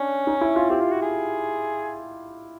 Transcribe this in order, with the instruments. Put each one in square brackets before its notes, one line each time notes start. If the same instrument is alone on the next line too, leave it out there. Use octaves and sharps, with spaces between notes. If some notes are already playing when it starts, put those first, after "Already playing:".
Already playing: [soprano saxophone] C#4 [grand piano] D4
[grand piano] D#4
E4
F4
[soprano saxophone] C4 [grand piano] G4
[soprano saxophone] F4
F#4
G#4